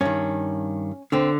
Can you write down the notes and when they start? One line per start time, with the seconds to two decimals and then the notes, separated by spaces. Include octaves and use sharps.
0.01 G2 D#3 C#4
1.12 D3 C4